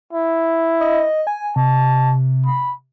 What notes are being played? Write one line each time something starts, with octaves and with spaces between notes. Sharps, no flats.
E4
D#5
G#5
C3 A5
B5